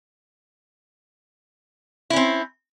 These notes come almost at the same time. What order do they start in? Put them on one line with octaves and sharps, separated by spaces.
E4 C#4 C4